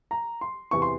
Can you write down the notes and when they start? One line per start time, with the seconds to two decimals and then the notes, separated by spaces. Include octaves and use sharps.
0.11 A#5
0.41 C6
0.71 E2 C3 E3 C#6
0.82 C6